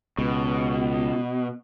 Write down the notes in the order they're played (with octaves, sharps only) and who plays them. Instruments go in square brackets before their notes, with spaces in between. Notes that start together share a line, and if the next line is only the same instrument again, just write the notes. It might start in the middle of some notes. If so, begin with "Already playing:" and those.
[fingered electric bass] C#2 [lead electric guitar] B2